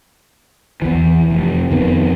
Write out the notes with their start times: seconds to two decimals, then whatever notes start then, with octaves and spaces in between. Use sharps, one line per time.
0.82 E2 E3
1.30 F1
1.71 F2 D#3 B3